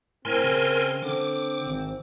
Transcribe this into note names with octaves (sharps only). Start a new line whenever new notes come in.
A2 C4 A#4 G#5 C6
C#3
D3 C4 D6
G#1